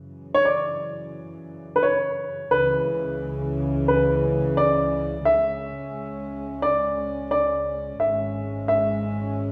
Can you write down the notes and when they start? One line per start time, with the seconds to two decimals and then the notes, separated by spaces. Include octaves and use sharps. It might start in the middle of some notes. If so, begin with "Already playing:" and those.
Already playing: F#2 C#3 E3
0.34 C#5
0.45 D5
1.76 B4
1.83 C#5
2.51 C#2 C#3 E3 B4
3.88 B4
4.57 D5
5.25 C#2 C#3 G#3 C#4 E5
6.62 D5
7.31 D5
8.00 G#1 G#2 G#3 C#4 E5
8.68 E5